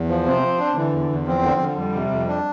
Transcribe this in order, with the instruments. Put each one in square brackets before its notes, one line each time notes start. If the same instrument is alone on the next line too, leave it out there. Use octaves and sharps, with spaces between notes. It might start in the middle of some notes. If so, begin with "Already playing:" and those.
Already playing: [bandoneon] E2
F3
[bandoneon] C3 [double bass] C4
[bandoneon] F3
D4
[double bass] D3 [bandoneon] E3
[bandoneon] E2
E2
[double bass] F3 [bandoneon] C4
[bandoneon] D3
D3
[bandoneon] F2 [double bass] G3
[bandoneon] C3
F2
D4